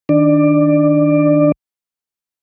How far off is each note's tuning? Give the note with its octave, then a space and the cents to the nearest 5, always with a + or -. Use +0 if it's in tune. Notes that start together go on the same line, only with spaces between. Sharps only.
D#3 +0 D4 +0 D5 +20